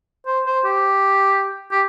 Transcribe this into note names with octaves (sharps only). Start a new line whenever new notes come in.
C5
C5
G4
G4